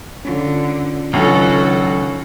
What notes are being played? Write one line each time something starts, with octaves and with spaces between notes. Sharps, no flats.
D3 C#4 F4
C#2 D#3 F#3 C#4 D4 F#4 A4